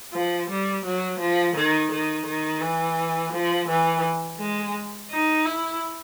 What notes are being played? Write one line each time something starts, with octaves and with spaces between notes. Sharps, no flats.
F3
G3
F#3
F3
D#3
D#3
D#3
E3
F3
E3
G#3
D#4
E4